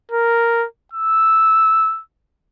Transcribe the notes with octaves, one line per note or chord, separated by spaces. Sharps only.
A#4
E6